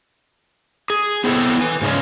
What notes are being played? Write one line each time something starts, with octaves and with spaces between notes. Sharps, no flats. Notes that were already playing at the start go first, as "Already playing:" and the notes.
G#4
B3 C4 E4 A4
B4 G#5
G#2 C#3 G#3 C#4